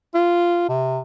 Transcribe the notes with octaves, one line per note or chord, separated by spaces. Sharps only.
F4
C3